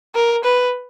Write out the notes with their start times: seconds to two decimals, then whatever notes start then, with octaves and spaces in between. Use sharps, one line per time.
0.15 A#4
0.44 B4